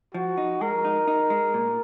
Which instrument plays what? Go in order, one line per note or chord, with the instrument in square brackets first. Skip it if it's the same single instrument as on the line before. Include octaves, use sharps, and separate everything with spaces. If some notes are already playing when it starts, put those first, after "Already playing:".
[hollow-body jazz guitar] F3 [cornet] F#4
[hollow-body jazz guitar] D#4
[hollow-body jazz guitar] G#3 [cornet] A#4
[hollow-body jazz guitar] D#4
D#4
G#3
A#2